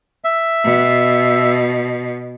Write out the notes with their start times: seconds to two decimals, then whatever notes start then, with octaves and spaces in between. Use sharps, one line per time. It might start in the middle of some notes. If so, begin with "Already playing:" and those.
0.24 E5
0.64 B2